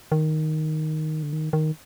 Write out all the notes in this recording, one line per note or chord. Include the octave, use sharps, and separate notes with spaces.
D#3
D3
D#3
D#3